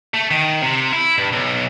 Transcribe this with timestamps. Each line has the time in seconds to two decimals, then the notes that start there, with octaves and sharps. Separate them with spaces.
0.14 A3
0.31 D#3
0.63 C3
0.92 E4
1.18 G2
1.32 B1